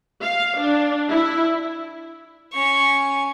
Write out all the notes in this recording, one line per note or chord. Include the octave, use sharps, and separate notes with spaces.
F5
D4
E4
C#4 C#6